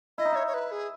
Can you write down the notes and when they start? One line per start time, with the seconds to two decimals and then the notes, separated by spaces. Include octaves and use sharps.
0.18 E4 D#5
0.25 D#4
0.32 E4 C#5
0.47 C#5
0.54 B4
0.71 G#4